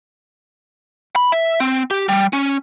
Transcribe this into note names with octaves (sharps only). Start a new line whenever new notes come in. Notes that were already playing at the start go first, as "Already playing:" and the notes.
B5
E5
C4
G4
G3
C#4